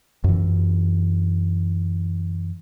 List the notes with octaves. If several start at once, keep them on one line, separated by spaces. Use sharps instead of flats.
F#2 E3